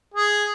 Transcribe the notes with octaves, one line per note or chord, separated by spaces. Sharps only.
G#4